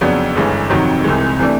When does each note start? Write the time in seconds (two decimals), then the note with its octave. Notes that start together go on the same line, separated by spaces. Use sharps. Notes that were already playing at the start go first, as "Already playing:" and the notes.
0.01 F2 C#3 F#3 B3 D4
0.35 G1 G2 E3 G#3 C#4
0.70 F2 C3 D#3 F#3
1.04 C2 C3 E3 G#3
1.39 C3 E3 A3 D4